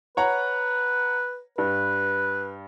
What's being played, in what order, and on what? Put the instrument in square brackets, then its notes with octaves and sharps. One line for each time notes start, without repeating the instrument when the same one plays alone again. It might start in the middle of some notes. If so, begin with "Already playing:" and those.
[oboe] B4 [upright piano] C#5 F#5 A#5
[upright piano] G2 [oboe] B4